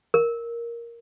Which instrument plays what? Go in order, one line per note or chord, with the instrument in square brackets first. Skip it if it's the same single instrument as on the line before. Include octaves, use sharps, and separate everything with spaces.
[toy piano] A#4